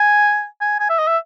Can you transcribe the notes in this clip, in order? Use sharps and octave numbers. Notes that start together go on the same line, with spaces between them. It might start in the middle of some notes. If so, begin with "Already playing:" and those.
Already playing: G#5
G#5
G#5
E5
D#5
E5